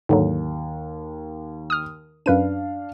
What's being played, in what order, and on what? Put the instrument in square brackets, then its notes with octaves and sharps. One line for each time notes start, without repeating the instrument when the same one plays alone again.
[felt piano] D#2 [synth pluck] G#2 D3 F#3
[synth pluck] D#6 F6
[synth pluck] F#2 B4 D#7 [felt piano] D4 F5